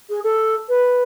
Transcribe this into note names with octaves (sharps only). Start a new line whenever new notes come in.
G#4
A4
B4